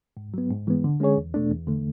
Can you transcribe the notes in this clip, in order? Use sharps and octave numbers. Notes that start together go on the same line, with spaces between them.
G#2
F#3 B3
G#2
E3 G#3 B3
D3
G#3 C#4 G#4 C#5
E2
B2 A3 D4
E2
D3 A3